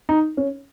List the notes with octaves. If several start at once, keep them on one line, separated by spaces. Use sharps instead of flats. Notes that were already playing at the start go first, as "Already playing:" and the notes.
D#4
C#4